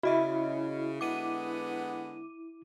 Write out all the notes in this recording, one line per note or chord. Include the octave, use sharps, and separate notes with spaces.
C#3 E4 F#4 D#5 E5
D3 G#3 B3 D6 D#7